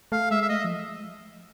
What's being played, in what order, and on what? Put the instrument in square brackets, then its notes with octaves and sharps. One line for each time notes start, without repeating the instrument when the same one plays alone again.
[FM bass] A3 [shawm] F5
[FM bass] G#3 [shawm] E5
[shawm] E5
[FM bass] A3 [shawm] D#5
[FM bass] F3